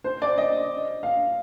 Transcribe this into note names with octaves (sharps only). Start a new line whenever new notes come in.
C5
D5
D#5
F5